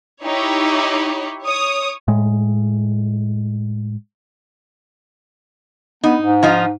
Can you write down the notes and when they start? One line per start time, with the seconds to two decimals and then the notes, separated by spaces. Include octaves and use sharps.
0.25 D#4 E4 G4 C#5
1.44 C#5 D#6
2.08 A2 G#3
6.04 B3 D#4
6.21 G#2
6.43 F3 D#4 F4